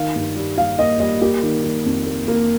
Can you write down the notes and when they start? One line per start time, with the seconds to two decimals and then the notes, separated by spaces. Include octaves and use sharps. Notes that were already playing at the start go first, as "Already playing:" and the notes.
Already playing: D#3 F5
0.16 G2
0.36 G3
0.58 G3 F5
0.79 A#3 D#5
1.00 G3 D#5
1.22 A#3 G4
1.43 D#3
1.64 D#3
1.86 F2
2.07 A#3
2.28 A#3